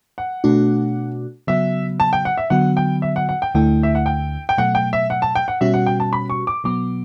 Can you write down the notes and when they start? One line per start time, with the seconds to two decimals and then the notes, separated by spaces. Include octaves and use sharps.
0.18 F#5
0.44 B2 A3 D4 F#4
1.47 C#3 F#3 B3 F#4 E5
2.00 A5
2.13 G5
2.25 F#5
2.37 E5
2.50 D3 F#3 B3 F#4 F#5
2.77 G5
3.02 E5
3.16 F#5
3.29 F#5
3.42 G5
3.54 D2 D3 A3 E4 G5
3.83 E5
3.95 F#5
4.06 G5
4.49 G5
4.58 B2 F#3 A3 F#5
4.75 G5
4.93 E5
5.10 F#5
5.22 A5
5.35 G5
5.48 F#5
5.61 B2 G3 C#4 F#4 E5
5.74 F#5
5.86 G5
6.00 A5
6.13 B5
6.30 C#6
6.47 D6
6.64 B2 F#3 B3 D6